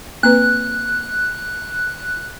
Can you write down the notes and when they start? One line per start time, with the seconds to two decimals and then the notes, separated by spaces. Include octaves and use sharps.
0.23 A#3 C4 B4 F#6